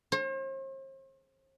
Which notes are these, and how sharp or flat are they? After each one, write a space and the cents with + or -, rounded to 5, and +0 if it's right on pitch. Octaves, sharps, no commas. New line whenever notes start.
C5 +45